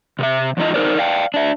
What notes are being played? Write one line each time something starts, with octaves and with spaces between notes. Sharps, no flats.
C3 B4 E5
E2 G#2 E3 D#4 F4 D#5
D#4 F4 A#4 C5 D5
D5 F5 G5
D4 E5